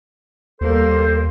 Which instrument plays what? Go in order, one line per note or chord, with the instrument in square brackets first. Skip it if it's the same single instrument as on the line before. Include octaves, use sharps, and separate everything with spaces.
[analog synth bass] D#2 [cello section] G3 A#3 [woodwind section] A4 C5